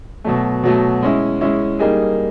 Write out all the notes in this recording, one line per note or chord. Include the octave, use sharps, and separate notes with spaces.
B2 F#3 A3
B2 F#3 A3
G#3 C#4 E4
G#3 C#4 E4
G3 A#3 D#4 G#4